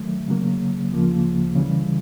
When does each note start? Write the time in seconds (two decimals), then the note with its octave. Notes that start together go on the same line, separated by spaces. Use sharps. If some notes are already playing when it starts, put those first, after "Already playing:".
Already playing: D#3 F#3 A3
0.28 C#3 F#3 A#3
0.92 D2 C#3 F3 A#3
1.56 C#3 E3 G3